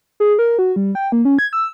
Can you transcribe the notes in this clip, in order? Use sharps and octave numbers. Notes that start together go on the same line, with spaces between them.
G#4
A#4
F#4
G3
G5
A#3
C#4
G#6
E6